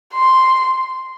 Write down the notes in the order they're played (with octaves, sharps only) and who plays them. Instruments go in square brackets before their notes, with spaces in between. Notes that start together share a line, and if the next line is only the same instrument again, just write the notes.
[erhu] C6